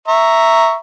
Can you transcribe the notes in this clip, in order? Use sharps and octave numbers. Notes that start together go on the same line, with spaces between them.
E5 A#5 C#6